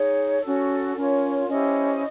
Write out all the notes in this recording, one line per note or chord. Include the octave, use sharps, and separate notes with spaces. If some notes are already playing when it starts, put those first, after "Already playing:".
Already playing: D#4 G#4 C#5
C#4 F#4 A4
C#4 F4 A#4 C#5
C#4 E4 G4 C5 D#5